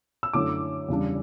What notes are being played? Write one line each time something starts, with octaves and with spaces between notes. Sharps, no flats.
E6
F#2 D3 A3 E4 D6
E2 C#3 G3 D4